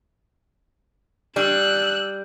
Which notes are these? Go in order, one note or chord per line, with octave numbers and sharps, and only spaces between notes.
G3 D4 E6 F#6